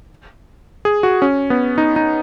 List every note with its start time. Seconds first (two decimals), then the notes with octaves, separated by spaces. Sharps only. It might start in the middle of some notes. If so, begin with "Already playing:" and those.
0.85 G#4
1.03 F#4
1.22 C#4
1.50 B3
1.78 D#4
1.96 D#4